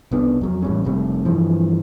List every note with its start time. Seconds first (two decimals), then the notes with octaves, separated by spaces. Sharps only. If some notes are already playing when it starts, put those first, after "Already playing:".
0.11 C2 B3 D4
0.41 F2 F#3
0.62 A1 G3 C#4
0.85 F1 C3 G3 A3
1.25 G2 E3 F3